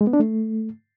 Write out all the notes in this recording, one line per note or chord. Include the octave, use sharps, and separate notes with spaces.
G#3
B3
D4
A3